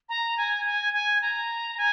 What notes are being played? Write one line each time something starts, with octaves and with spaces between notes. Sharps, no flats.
A#5
G#5
G#5
G#5
A#5
G#5